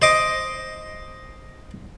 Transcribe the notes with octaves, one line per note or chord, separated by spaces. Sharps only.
C5 D#5 D6